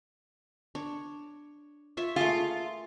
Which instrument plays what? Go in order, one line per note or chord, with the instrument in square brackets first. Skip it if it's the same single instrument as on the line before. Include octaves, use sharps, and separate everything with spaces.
[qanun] D4 C#5
F4 C#5 E5
[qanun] A3 A#3 G#4 [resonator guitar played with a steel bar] F4